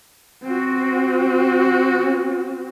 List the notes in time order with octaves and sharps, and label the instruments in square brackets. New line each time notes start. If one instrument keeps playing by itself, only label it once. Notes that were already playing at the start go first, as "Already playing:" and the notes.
[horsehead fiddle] C4 F#4